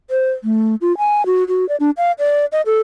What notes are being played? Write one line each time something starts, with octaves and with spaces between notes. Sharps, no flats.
C5
A3
F4
G#5
F#4
F#4
D5
D4
F5
D5
D#5
A4